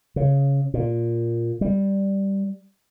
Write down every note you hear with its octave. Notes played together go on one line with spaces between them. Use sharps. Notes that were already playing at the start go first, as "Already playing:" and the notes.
C#3
A#2
G3